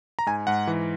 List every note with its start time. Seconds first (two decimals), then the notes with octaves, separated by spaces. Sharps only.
0.19 A#5
0.26 G#2 G#5
0.47 G#2 F#5
0.67 E3